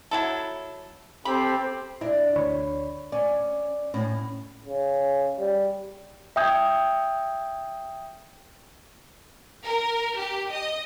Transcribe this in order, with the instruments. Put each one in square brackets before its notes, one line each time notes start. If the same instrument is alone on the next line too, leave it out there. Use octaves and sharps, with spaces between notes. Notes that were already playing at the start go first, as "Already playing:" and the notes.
[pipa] F#3 E4 A4
[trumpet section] C4 G4 A4 [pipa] B5
[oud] D4 [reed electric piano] E4
[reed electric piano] D2 C#5 B5
[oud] C#4 [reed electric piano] D5
[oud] A2 [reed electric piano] C#4
[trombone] C#3
G3
[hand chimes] E5 G5 D#6 G6 G#6
[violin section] A#4
G4
D#5